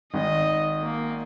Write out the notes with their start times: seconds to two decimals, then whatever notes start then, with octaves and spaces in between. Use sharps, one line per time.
0.14 G#1 D#5
0.82 A#3